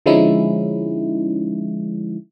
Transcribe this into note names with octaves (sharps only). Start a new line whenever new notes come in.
D3 F3 G#3 C#4 D#4 E4